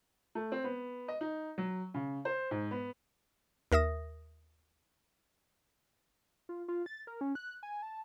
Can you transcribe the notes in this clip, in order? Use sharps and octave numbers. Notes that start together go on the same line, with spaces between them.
A3
C4
B3
D#5
D#4
F#3
C#3
C5
G#2
B3
D#2 A#4 E5 D#6 A#6
F4
F4
A6
A#4
C#4
F#6
G#5
A5